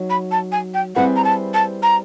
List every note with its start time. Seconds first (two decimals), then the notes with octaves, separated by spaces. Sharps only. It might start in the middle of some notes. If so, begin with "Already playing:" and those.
Already playing: F#3 D#4
0.10 B5
0.31 A5
0.52 G#5
0.74 G5
0.96 G3 C4 E4 G#4 B4 F#5
1.16 A#5
1.24 A5
1.54 A5
1.83 A#5